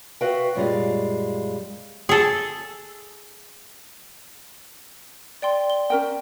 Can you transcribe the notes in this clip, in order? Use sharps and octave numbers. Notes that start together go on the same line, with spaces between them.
F#4 B4 E5 F5 G5
F#2 A#2 G3 G#3 F5
G#4 A4
D5 G5 C6
G7
C#4 A#4 G5